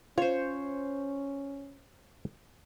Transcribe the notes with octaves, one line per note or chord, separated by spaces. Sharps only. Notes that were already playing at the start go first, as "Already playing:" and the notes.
C#4 F4 C5 C#5